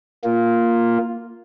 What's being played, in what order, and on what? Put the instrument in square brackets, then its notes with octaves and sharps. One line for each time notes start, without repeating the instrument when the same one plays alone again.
[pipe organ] A#3 F4